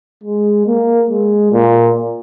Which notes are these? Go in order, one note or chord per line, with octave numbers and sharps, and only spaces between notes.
G#3
A#3
G#3
A#2